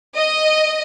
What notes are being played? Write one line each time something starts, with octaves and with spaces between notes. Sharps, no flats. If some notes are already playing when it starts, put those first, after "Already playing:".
D#5